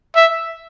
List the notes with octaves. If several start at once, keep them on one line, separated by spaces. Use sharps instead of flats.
E5